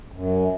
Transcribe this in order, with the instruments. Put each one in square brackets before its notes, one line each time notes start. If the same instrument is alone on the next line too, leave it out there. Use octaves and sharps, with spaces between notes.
[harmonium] F#2